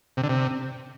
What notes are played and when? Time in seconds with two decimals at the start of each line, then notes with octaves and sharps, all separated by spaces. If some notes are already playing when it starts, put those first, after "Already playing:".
0.17 C3
0.23 D3
0.29 C3